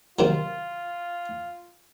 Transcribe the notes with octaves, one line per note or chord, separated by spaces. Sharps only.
C3 D#3 F#3 F4